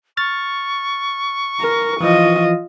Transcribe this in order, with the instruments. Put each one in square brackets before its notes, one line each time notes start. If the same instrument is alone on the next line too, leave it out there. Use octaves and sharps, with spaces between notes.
[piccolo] C#6 [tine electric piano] F6 A6
[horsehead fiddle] A#4
[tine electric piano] E3 F3 [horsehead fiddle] F4 D#5